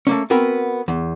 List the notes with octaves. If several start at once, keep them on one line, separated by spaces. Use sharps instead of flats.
A3 A#3 C#4
B3 C4 F#4 A#4 B4
E2